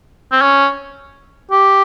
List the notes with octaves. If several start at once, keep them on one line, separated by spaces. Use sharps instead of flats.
C4
C#4
G4